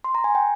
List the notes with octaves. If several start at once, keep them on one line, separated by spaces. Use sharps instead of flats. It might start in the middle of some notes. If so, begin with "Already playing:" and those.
C6
A#5
G#5
G5